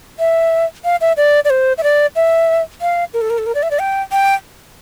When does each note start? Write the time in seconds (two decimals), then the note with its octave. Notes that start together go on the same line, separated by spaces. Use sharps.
0.19 E5
0.85 F5
1.01 E5
1.17 D5
1.45 D5
1.50 C5
1.78 E5
1.83 D5
2.16 E5
2.81 F5
3.14 A#4
3.21 A4
3.30 A#4
3.38 A4
3.46 A#4
3.55 D5
3.63 E5
3.71 D5
3.79 G5
4.12 G5